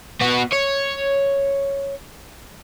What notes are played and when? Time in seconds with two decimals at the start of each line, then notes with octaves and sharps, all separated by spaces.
0.21 B3 F#4
0.52 C#5